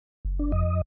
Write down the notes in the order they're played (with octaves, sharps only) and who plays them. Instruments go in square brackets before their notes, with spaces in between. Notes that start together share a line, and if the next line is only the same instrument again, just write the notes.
[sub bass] F#1
[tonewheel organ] D4
F2 D#5